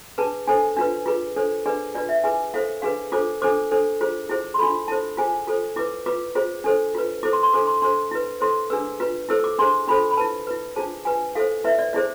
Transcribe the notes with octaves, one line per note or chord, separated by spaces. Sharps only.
D4 G#4 B4 A5
D4 A4 C5 G#5
D4 F4 B4
F4 G#4 B4
D4 A4 C5
D4 G#4 B4 D5
D4 F4 B4 D5
E5
E4 G#4 B4 G#5
E4 A4 C5 F5
D4 G#4 B4 F5
D4 F4 A4 C5 D6
D4 A4 C5 D6
D4 A4 C5
F4 G#4 C5
E4 G#4 C5
C6
D4 F4 A4 B5
E4 A4 C5 A5
F4 G#4 C5 G#5
F4 A4 C5
E4 B4 D6
F4 B4 D6
F4 G#4 C5
D4 A4 C5
F4 B4
E4 A4 C5 D6
C6
C6
D4 A4 C5 D6
C6
D4 A4 C5 C6
E4 B4
E4 A4 C5 C6
D4 G#4 B4 E6
F4 B4
E4 A4 C5 E6
D6
D4 G#4 C5 C6
D4 F4 A4 C5 B5
B5
E4 B4 A5
E4 B4
D4 F4 G#4 C5 A5
F4 B4 G#5
E4 A4 C5 F5
E4 B4 E5
D5
E4 G#4 C5 D5